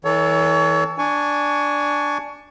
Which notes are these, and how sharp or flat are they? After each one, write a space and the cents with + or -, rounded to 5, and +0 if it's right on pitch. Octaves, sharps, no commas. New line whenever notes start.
E3 -30 A4 +0 C#5 +30
D4 +0 G#5 +0 C#6 +20